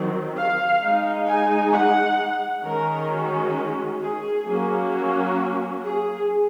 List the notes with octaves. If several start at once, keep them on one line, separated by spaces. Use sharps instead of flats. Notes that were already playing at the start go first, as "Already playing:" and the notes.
Already playing: D#3 F#3 C4
F5
G#3 D#4
G#5
F#5
D#3 G#3 C#4 A#4
F#4
G#4
F#3 A#3 C#4
F#4
G#4